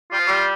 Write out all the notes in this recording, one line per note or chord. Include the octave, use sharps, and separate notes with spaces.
G3 F4
F3
G3